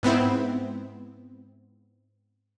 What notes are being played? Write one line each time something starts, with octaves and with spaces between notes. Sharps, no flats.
G#2 B3 C4 E4